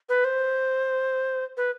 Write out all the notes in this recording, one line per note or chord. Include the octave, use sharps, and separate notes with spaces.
B4
C5
B4